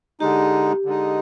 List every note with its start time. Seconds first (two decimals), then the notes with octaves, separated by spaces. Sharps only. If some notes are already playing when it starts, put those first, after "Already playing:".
0.20 D3 G#3 D#4 G4
0.85 D3 G#3 D#4